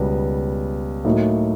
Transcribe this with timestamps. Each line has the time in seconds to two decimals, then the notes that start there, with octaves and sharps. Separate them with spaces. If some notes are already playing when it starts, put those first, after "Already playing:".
Already playing: C#2 B2 G3 B3
1.05 A2 F#3 A#3 D#4